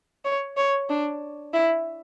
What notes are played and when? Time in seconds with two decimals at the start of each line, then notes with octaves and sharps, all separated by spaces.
0.25 C#5
0.57 C#5
0.90 D4
1.53 E4